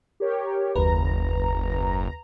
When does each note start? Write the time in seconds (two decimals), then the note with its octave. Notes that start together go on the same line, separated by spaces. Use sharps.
0.20 G4 A#4 C#5
0.76 F#1 D#2 B4 A#5